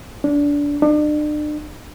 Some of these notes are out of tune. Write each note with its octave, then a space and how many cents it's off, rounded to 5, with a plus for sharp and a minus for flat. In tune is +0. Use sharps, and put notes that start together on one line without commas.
D4 -20
D4 +40